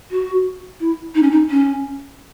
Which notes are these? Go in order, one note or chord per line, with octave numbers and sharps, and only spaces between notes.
F#4
E4
D#4
C#4
D#4
C#4